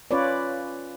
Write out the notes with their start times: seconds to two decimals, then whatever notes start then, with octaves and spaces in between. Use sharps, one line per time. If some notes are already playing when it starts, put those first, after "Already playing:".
0.11 C#4 F4 B4 C#5 D5